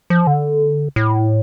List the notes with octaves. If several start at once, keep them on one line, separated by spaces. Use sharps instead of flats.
F3
D3
A2